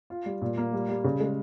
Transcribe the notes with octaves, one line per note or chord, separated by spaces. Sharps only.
F4
G3
A#2
A#3
G3
G3
C#3
G#3